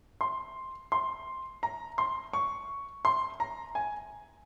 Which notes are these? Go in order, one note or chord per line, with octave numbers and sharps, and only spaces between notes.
C6
C6
A#5
C6
C#6
C6
A#5
G#5